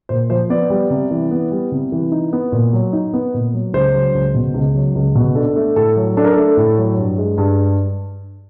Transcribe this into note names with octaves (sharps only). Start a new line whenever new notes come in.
A#2 C5
F3 C5
B3 D5
G3
C3
E3
B3
G3
C3
E3
D#4
B3
A#2
F#3
D#4
B3
A#2
F#3
C#2 C5
F#3
C#2
B2
C#2
F#3
C#2
B2
D4 A4
A3
A2 A4
F#3
D4 A4
A#4
A3 A4
A2
F#3
G2
G#3
G2